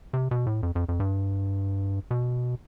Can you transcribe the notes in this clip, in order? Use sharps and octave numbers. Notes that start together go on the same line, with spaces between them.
C3
B2
A2
F2
F2
F2
G2
B2